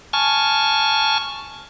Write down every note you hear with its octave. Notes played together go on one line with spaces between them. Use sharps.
G#5 A5 C#6 F6